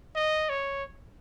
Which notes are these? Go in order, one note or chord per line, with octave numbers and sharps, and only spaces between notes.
D#5
C#5